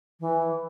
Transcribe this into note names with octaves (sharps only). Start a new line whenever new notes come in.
E3